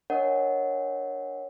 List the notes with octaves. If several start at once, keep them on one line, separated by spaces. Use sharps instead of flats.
D4 A#4 C#5 D#5 F#5